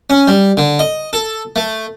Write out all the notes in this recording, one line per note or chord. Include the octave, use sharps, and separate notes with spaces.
C#4
G3
D3
D#5
A4
A3